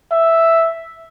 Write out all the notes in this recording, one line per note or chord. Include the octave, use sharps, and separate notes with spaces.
E5